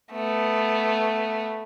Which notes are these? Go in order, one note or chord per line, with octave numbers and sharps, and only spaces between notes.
A3 B3